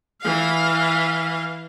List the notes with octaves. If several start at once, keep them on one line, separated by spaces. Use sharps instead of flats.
E3 F5